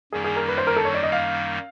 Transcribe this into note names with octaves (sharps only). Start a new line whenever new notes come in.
F#2 D#3 G3 A#3 D#4 G#4
G#4
A#4
B4
C5
A#4
A4
C#5
D5
D#5
F5